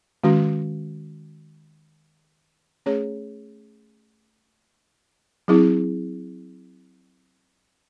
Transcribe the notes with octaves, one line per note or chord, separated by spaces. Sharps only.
D#3 G#3 C#4 F#4
A3 C#4 G#4 C#5
F#3 C4 E4 G#4